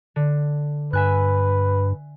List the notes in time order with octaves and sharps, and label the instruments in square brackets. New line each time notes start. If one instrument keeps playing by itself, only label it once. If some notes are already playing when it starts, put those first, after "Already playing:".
[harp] D3
[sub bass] G2 [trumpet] B4 [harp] E5 G#5 F#6